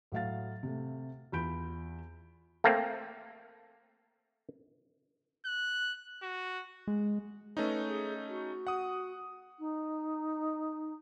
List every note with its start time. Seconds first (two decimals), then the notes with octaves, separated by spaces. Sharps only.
0.12 A2 F#3 F5 A6
0.63 C3 A3
1.32 E2 F4 B5 G6 D7
2.64 A3 A#3 C4
5.46 F#6
6.22 F#4
6.88 G#3
7.57 A3 C#4 D#4 B4
7.88 G#4
8.29 F#4
8.67 F#5 D#6
9.59 D#4